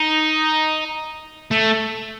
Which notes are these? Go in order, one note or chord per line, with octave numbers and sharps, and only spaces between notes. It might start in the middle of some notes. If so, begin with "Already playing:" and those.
Already playing: D#4
A3